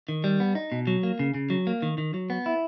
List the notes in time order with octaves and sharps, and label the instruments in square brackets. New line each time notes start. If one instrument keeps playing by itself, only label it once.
[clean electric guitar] D#3
G3
B3
D#4
B2
F#3
A#3
C#3
C#3
F#3
A#3
D#3
D#3
F#3
B3
E4